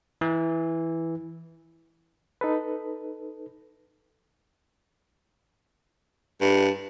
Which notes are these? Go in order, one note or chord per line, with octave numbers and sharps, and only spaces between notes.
E3
D#4 A4 B4
G2